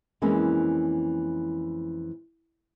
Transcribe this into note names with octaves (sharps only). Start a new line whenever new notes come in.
F2 E3 G#3 A#3 C#4